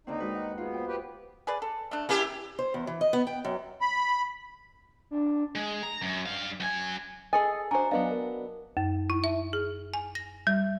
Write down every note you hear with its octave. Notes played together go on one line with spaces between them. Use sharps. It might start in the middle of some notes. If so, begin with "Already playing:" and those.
D#2 D3 C4 D#4
G#3 F#4 B4
F#5
B3 F4 G#4
C5 G5
G4 B4
G#4 B4 D5
A4
A3 D4
A#3 C#4 E4 G4
C5
E2
E3
D#5
B3
G5
F#2
B5
D4
G#3
A#5
F#2
G2 F5
F#2 G#5
G#4 A4 D#5 G#5 D#6 A6
D4 F#4 C5 G#5 A#5
F#3 B3 D4 D#5 F5
A#4
F#2
E4
E5
G#4
G#5
A#6
G3